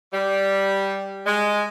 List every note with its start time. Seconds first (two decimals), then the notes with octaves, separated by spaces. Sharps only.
0.13 G3
1.25 G#3